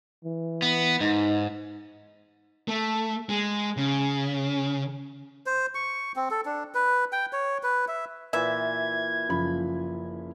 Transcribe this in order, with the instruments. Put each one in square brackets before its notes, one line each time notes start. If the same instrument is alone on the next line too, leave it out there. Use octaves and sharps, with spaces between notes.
[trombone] E3
[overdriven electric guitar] B3
[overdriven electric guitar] G#2 [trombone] D#4
[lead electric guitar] A3
G#3
C#3
[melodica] C5
C#6
C4
A4
D4
B4
G5
C#5
B4
E5
[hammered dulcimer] A#2 E3 [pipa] E5 [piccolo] G#6
[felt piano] F#1 F3 B5